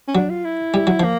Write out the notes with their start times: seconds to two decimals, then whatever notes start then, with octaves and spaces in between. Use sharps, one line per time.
0.08 C#4
0.15 F#3 D4
0.30 F4
0.45 E4
0.74 G3
0.87 F#3
1.00 F3 A#3